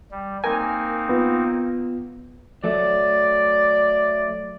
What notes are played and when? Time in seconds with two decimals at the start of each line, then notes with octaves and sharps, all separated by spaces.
0.12 G3
0.44 A#3 C4 D#4 A#4 G#5
1.09 B3 F4
2.64 F#3 A3 D5